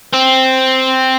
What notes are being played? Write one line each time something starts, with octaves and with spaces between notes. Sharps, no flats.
C4